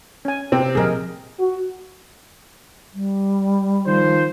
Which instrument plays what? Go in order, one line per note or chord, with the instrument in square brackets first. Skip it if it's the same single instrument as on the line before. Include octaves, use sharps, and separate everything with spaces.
[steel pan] C#4 G#5
[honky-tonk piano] C3 C4
[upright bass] A#2 F3 [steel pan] G#4 A#4 D#5
[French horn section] F#4
[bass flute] G3
[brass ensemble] D#3 F3 C5